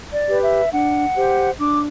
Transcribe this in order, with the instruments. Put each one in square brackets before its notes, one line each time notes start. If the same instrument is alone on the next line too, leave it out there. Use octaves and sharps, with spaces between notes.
[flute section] D5
G4 B4
E5
D4 F#5
G4 C5
D4 D6